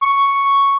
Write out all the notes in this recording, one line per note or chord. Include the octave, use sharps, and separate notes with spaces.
C#6